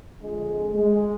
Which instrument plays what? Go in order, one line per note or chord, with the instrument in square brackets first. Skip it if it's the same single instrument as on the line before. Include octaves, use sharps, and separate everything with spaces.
[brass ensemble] F2 D3 F3 G#3
G#3